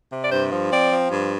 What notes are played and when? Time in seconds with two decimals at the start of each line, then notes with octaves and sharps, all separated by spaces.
0.11 C3
0.24 D5
0.31 G2 C5
0.52 F3
0.71 C4 D5
0.91 F3
1.10 G2